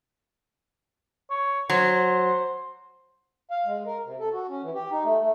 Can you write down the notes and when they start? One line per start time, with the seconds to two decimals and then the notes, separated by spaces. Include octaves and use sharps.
1.30 C#5
1.70 F#3 C5
3.51 F5
3.65 G#3
3.86 A#4
4.05 C3
4.20 A4
4.33 F#4
4.49 C#4
4.63 E3
4.74 G4
4.91 D#4
5.04 A3
5.20 A3